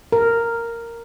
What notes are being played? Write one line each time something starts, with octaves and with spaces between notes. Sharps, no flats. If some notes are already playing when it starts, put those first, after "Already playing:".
A#4